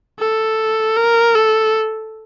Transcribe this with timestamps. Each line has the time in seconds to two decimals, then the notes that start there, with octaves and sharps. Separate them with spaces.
0.19 A4
0.97 A#4
1.35 A4